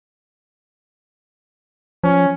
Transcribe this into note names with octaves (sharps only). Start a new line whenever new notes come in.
F3 C#4